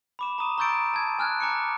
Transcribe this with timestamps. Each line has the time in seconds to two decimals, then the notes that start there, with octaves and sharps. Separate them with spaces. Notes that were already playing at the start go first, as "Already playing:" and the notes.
0.19 B5 D6 E7
0.38 A#5 C#6 D#6 D#7
0.58 A#5 C#6 E6 G6 A6 D7
0.94 A5 A#5 G#6
1.19 G#5 F6 F#6 G#6
1.40 G#5 A#5 D6 F#6 C#7